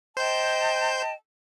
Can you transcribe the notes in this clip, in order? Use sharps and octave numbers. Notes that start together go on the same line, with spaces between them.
C5 D#5 G5 A5 G6